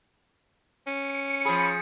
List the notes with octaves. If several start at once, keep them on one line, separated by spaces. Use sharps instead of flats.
C#4 C#7
F3 G#4 B5